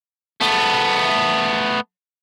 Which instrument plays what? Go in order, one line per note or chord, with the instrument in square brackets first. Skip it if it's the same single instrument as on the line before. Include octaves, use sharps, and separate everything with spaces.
[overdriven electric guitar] A3 B3